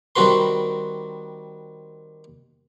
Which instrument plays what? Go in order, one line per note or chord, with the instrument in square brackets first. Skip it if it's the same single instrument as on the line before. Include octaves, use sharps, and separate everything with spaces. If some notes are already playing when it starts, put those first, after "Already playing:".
[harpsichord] D#3 G3 C4 F#4 B4 C6